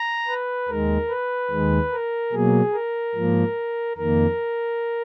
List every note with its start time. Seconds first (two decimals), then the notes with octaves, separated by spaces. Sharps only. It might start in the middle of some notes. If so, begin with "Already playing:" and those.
Already playing: A#5
0.28 B4
0.68 D#2 D#3 G#3 A#4
1.10 B4
1.50 D#2 D#3 G#3
1.92 A#4
2.33 B2 F#3 A#3 G#4
2.73 A#4
3.15 G#2 F3 A#3
3.97 F2 D#3 A#3 A#4